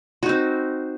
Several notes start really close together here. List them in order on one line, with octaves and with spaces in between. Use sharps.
F#4 D#4 C4